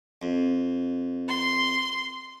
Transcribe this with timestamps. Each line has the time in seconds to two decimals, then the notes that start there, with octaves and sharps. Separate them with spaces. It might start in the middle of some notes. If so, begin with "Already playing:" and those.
0.22 F2
1.29 C6